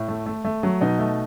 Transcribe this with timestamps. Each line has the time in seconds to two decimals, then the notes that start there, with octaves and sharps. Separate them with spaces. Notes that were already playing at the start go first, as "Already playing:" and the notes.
Already playing: A2
0.08 A3
0.26 A3
0.45 A3
0.63 F#3
0.81 B2 D#4 D#5
0.99 A3